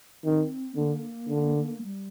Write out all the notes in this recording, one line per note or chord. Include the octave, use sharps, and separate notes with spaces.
D#3 C4
D3 A#3
D3
G3